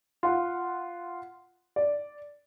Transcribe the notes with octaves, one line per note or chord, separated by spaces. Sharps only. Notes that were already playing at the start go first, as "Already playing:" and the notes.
F4 F#5
D5